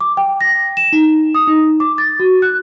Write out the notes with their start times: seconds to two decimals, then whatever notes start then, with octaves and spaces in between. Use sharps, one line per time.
0.01 D6
0.17 G5
0.41 A#6
0.77 E7
0.92 D#4
1.35 D#6
1.47 D#4
1.80 D6
1.98 A6
2.20 F#4
2.42 F#6